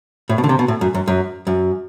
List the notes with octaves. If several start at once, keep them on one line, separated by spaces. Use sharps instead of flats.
A2
B2
D3
C3
B2
A2
F#2
F#2
F#2
F#2